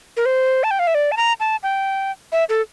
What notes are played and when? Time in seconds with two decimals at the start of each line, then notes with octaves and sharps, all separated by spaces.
0.17 A#4
0.26 C5
0.64 A5
0.71 G5
0.79 F5
0.87 E5
0.95 D5
1.12 A5
1.17 A#5
1.40 A5
1.63 G5
2.32 E5
2.49 A4